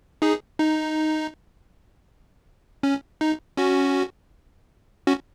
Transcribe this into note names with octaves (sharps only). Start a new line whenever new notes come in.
D#4 G#4
D#4
C#4
D#4
C#4 F#4
C#4 F#4